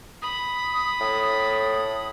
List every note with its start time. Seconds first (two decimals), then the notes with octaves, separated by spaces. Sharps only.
0.22 B5 D#6
1.01 A2